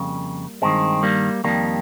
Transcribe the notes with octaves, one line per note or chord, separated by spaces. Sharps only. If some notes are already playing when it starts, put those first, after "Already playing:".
Already playing: F2 C#3 G3 A#3
G2 D#3 G#3 C4
G3 A#3
F2 D#3 G3 A#3